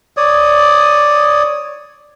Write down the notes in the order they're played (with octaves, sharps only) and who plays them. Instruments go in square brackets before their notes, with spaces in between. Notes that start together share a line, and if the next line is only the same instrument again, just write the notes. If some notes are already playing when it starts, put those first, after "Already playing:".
[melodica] C#5 D5 D#6